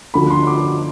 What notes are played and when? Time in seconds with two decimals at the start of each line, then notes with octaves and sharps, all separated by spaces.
0.14 D2 D3 F3 B5
0.31 C6
0.47 D6